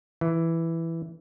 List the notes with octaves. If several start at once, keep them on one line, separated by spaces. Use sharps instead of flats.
E3